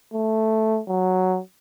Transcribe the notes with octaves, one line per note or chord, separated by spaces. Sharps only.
A3
F#3